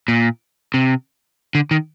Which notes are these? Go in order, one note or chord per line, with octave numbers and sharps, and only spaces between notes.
A#2
C3
D3
D#3